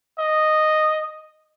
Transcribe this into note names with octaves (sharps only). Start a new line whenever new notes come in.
D#5